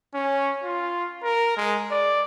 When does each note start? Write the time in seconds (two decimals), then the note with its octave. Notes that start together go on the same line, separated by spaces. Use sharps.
0.14 C#4
0.64 F4
1.23 A#4
1.56 G#3
1.91 D5